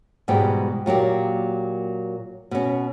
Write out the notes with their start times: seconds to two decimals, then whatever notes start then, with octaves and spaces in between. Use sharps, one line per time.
0.28 G#2 B2 E3 G3 G#3 G5
0.86 A#2 F#3 A#3 G4
2.51 B2 C#4